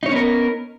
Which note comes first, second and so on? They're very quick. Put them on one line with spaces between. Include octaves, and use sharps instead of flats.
D#4 C#5 C#4 B3 A#4